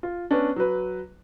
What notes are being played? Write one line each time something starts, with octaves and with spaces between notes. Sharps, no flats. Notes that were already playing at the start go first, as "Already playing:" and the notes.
F4
B3 C#4 D4
F#3 B4